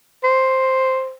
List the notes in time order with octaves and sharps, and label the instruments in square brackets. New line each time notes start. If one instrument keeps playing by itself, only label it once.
[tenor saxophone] C5